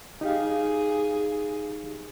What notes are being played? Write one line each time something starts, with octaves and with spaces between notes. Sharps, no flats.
D#4 G4 G#4 F5